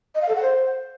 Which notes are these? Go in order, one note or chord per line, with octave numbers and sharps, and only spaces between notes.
D#5
F5
A4
F#5
C5